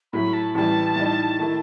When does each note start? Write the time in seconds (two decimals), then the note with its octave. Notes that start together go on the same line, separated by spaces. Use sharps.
0.13 A2 F#3 A3 B5
0.33 A5
0.54 A1 A2 E3 G3 A5
0.96 A2 G3 D#4
1.39 D#3 A3 E4